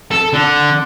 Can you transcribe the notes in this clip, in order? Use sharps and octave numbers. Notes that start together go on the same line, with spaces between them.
A4
D3